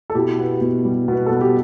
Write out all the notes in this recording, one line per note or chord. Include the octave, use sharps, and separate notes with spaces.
A4
B2 E4 G4
B3
B2
G3
B2 B4
B3 A4
G4